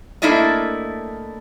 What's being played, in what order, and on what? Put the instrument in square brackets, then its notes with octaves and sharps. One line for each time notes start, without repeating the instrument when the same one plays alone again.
[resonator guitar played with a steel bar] A3 A#3 D4 E4 D5 D#5